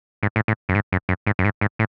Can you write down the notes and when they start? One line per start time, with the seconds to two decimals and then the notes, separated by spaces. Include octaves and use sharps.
0.23 G#2
0.36 A2
0.48 A2
0.69 F#2
0.75 G#2
0.92 F#2
1.09 F#2
1.27 G#2
1.39 F#2
1.45 G#2
1.61 G#2
1.79 A2